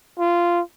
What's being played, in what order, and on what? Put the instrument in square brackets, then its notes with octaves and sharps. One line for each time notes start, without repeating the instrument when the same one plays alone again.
[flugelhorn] F4